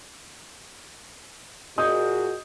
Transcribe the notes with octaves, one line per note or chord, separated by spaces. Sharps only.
A#2 F#4 G#4 D#5 D#6 G6